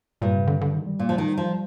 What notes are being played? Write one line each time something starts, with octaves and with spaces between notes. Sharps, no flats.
G2 A#2
C3
D3
D3
D#3
G3
A#2
F3
D#3
F3